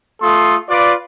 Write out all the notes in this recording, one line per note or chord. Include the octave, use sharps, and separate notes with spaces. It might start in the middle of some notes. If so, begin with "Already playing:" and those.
A3 F4 A4 C6 D#6
F4 B4 D5